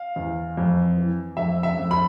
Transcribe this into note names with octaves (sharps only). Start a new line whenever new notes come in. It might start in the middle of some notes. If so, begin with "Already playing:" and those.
Already playing: F5
E2
F2
E3
F2 E5
E5
F2
B5